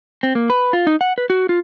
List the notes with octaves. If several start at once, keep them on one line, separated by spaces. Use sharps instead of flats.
C4
A#3
B4
F4
D#4
F#5
B4
F#4
F4